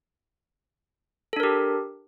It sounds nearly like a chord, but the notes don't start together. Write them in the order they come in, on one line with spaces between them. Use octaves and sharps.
A4 D4 A#4 G4